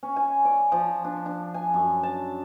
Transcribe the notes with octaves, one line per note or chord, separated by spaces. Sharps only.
C#4
G#5
D5
F3
D4
D4
G#5
F#2
A5